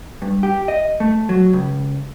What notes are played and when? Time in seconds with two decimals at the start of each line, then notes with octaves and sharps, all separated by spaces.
0.22 G2
0.43 G4
0.68 D#5
1.00 A3
1.29 F#3
1.53 C#2